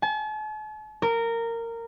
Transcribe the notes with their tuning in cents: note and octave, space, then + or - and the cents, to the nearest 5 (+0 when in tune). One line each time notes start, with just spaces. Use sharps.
A5 -45
A#4 -15